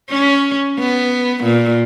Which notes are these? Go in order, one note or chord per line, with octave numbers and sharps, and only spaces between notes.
C#4
B3
A#2